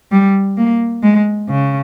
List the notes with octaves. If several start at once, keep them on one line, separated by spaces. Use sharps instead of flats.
G3
A#3
G#3
C#3